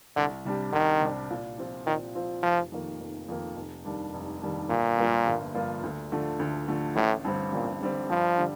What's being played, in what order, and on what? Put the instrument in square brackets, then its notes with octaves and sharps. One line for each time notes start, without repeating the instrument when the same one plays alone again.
[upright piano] C2 [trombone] D3
[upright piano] C3 G3 D4 G4
[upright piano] C2 [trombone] D#3
[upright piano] C3 G3 D4 G4
A#2
F3 C4 F4
[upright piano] A#2 [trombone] D#3
[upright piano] F3 C4 F4
[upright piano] F1 [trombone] F3
[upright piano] F2 D#3 A#3
F1
F2 D#3 A#3
F1
D#2 D#3 G3 D4
F1
D#2 D#3 G3 D4
[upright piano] G1 [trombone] A#2
[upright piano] G2 F3 A#3 F4
G1
G2 F3 A#3 F4
D2
D3 F3 A3
D2
D3 F3 A3
[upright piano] A1 [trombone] A2
[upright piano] G2 D3 G3 C4
[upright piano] A1 [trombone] A#2
[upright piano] G2 D3 G3 C4
[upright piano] G2 [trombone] F3
[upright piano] D3 G3